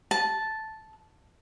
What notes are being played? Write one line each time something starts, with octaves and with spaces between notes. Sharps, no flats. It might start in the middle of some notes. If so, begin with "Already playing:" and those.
A5